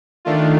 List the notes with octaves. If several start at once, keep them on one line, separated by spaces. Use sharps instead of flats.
D#3 A3 D4 F4